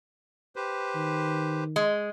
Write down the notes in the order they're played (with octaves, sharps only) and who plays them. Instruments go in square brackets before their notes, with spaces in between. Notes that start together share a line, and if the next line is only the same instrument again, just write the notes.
[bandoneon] G4 B4 C5
[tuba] D#3
[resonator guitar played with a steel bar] G#3